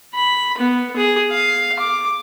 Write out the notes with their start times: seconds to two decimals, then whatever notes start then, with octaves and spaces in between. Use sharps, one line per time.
0.14 B5
0.58 B3
0.97 G#4
1.31 F5
1.79 D6